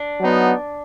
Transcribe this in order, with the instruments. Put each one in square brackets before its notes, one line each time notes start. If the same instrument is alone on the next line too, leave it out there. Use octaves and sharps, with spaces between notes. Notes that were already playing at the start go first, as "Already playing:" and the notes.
Already playing: [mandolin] D4
[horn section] F#3 B3 D#4